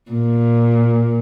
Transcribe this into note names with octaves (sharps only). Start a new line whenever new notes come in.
A#2